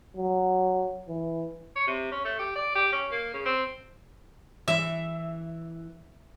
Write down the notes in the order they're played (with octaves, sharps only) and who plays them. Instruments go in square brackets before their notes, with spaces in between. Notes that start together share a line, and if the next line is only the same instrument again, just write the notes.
[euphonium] F#3
E3
[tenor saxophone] C#5
C3
C#4
A3
G4
D5
G4
C#4
A#3
C#3
C4
[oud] E3 E4 [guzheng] E5